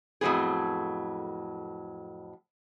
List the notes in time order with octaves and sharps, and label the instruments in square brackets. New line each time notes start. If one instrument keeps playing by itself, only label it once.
[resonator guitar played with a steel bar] F2 A2 F#3 B3 G#4